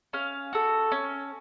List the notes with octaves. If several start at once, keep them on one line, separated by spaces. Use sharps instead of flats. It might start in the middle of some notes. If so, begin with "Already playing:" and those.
C#4 F5
F#4 A4
C#4